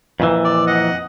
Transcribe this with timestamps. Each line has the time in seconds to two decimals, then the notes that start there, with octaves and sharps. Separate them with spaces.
0.20 F2 A#2 E3
0.44 D5
0.67 D#5 F#5